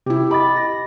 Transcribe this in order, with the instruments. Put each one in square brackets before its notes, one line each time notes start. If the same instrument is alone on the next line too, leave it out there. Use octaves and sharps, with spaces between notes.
[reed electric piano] C3 [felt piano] E4 G4
[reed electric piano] G4 D#5 [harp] B5 A6 [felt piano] D6
[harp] A#6